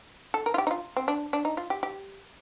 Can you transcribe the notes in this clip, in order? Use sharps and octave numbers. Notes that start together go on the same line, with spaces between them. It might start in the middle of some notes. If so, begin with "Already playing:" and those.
A4
A#4
F4
G4
D#4
F4
C4
D4
D4
D#4
F4
G4
G4